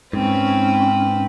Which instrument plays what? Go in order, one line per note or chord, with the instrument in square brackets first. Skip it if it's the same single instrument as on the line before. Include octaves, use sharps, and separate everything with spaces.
[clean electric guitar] G#2 [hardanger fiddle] C4 B4 [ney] C#4